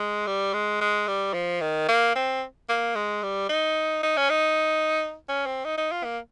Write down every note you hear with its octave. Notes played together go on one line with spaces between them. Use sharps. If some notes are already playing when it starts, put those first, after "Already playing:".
Already playing: G#3
G3
G#3
G#3
G3
F3
D#3
A#3
C4
A#3
G#3
G3
D#4
D#4
C#4
D#4
C#4
C4
D#4
D#4
F4
A#3